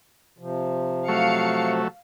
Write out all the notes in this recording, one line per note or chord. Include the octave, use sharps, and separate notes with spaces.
C3 F3
F#3 A3 F5 C#7